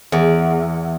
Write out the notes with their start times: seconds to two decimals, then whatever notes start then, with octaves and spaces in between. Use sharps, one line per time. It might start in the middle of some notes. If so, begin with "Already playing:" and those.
0.12 E2